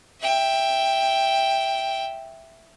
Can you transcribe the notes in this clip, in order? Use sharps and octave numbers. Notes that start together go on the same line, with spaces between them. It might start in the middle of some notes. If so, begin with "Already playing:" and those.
E5 G5